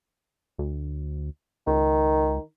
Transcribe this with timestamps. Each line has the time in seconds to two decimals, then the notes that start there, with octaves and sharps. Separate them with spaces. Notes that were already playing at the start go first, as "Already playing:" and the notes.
0.58 D2
1.67 C#2 D#3